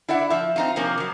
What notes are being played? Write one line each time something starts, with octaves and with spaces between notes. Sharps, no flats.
E4 D5 E5 F#5
F3 E5
C4 D#4 F4
C3 F3 A#3 C#4
F3 F#3